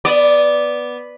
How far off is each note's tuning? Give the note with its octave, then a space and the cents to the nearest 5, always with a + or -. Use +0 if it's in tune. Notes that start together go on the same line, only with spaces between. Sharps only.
B3 +0 D5 +0